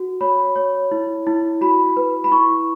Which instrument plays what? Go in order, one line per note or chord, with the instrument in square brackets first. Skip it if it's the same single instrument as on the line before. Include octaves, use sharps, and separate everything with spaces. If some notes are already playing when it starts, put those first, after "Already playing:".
Already playing: [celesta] F#4
C#5 B5
C#5
E4
E4
F#4 B5
B4
B5
E4 C#6